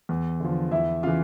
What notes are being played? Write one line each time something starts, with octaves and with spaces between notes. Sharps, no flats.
E2
D3 F3
E2 E4 E5
C#3 E3 F4 F5